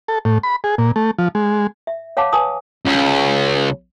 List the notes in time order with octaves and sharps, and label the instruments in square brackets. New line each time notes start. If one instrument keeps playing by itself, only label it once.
[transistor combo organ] A4
A2
B5
G#4
A#2
A3
F3
G#3
[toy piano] E5
C#5 F5 F#5 A5 D6
B4 G#5 A5 D#6
[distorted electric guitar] C#2